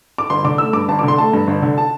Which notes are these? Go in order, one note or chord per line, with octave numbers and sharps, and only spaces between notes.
D6
G1 C6
D3 D6
A3 E6
G2 D6
G1 A5
D6
D3
C6
A3 A5
G2
G1
D3
A5